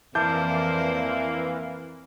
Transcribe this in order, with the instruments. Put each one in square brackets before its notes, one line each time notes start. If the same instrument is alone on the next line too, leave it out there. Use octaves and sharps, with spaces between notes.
[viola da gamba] F2 C5 D5 [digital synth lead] E3 [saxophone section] A#3 [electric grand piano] A5 D6 G6